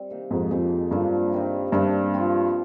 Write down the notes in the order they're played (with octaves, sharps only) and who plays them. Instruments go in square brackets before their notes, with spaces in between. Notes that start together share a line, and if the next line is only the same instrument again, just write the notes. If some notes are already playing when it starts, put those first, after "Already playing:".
Already playing: [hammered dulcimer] G3 C4
C3 D#3 A#3
[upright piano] F2 G#2
[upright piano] F2 [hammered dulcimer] F3 G#3 C4 D#4
[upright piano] G2 [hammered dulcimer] D3 F3 A#3
[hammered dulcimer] C3 D#3 G3
[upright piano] G2 [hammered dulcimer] C3 G3 A#3 D4
[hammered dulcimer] F3 C4 F4